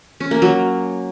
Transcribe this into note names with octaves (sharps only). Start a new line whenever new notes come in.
C#4
A#3
F#3